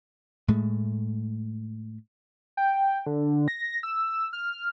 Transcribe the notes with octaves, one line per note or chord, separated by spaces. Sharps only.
A2 G#3 A3
G5
D3
A#6
E6
F6